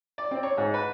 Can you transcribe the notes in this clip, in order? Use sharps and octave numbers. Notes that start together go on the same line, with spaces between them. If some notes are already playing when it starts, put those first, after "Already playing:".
D5
C4
C#5
G#2
B4